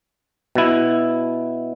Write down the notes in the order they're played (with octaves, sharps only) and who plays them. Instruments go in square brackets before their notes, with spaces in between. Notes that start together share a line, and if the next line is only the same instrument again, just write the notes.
[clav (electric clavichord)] B2 E4